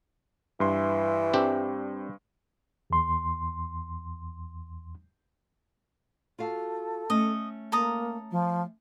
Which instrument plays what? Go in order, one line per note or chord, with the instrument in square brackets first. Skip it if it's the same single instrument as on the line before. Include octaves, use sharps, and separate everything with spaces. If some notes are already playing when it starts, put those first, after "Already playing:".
[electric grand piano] G2 C6 [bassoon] E3
[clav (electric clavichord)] C4 D4 G4
[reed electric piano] E2 C6
[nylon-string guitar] F4 F#4 F5 [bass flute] A4
[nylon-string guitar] A3 C#4 [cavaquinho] D#5
[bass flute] A#3 [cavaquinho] A4 A#5 D#6
[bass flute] F3